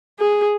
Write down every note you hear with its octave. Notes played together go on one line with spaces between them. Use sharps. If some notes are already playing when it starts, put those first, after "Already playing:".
G#4